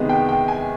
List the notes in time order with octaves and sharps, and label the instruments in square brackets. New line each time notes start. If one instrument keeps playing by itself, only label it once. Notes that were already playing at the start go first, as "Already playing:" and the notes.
Already playing: [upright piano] C3 D#3 G#3 B3
G5
G5
G#5